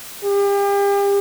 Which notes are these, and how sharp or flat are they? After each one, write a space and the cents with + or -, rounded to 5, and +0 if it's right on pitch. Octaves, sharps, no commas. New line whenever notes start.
G4 +40